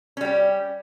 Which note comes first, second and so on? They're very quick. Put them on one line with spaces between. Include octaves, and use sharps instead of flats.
C#4 G3 G4